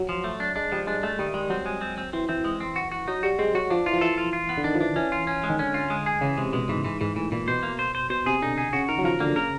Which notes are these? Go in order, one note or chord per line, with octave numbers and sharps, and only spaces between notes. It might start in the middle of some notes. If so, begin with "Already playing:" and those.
Already playing: F#3
F3
A3
D4
G#3 D4
F3 G3
G#3 D4
G#3 A3
D#3 G3
G3 G#3
F#3 C4
G#3
C4
C4
E3 C4
E3 C4
G#3
C4
F#4
F#4
F#3 D#4
G3 F#4
G#3 C4
F#3 F#4
F3 D4
E3 F4
F3
E3 A4
F4
F4
B3
D3
D#3 D4
F3
E3 D4
E3 C#4
F4
C#4
G#3
D#3
D3 C#4
F4
G#3
G#4
C#3 E3
C3 G#3
B2 G#3
G#2 E3
G#2 E3
G#2 E3
A2 E3
A#2 E3
B2 C5
A#3
C5
C5
B2 C5
C3 G#4
D3 D#4
G#4
C#3 F#4
D#3 A#4
F#3
F3 A#4
D3 A#3
C#3 A#4